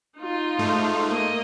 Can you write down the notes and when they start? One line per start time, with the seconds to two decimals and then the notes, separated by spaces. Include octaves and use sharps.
0.19 D#4 F4
0.59 G#2 A3
1.08 A#3 D#5